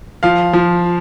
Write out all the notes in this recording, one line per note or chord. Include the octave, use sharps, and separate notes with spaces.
F3 F5
F3